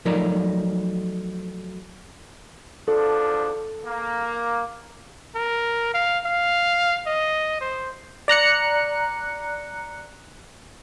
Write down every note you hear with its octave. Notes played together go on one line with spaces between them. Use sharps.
F3 F#3 A3 D#4 A#4 D5
E2 F3 D4 A4
A#3
A#4
F5
F5
D#5
C5
D5 A#5 F#6 C#7